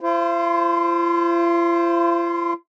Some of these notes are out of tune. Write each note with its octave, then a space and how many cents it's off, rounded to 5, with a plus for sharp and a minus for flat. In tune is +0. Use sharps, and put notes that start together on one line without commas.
F4 -45 C5 +0